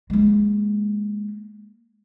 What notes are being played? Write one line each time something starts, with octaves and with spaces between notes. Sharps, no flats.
G#3 A#3